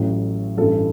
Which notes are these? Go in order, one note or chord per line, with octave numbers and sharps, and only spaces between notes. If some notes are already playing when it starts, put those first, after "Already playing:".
Already playing: A1 A2 F#3
A1 G2 E3 A4